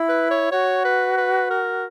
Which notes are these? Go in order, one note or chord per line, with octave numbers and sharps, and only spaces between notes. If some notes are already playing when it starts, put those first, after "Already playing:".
Already playing: E4
B4
C#5
F#4 C#5
B4
B4
A#4